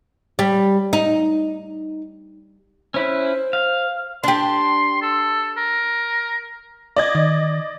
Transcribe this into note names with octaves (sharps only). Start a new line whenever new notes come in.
G3
D#4
C#4 E4 B4 C5
F5
D4 G4 C6
A4
A#4
D5 D#5 G#6
D#3